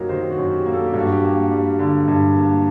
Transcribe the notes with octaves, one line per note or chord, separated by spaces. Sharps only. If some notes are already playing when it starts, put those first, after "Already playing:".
Already playing: F#2 F#3 A#3 D#4 G4 A#4
D#3 C5
F#4
F#2
G4
A#3
A4
G4
G2
F#4
G4
A#3
G3
D3
G2
A#3